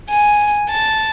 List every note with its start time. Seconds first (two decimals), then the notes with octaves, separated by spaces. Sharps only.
0.10 G#5
0.70 A5